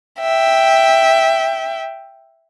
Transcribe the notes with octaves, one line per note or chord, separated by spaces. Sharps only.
E5 G5